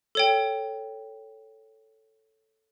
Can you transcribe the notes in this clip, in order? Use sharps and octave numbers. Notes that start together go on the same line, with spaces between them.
A4 C#5 G5